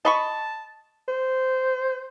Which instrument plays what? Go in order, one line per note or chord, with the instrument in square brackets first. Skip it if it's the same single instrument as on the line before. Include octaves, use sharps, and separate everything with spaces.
[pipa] D#5 B5 C#6 [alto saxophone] A5
[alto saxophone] C5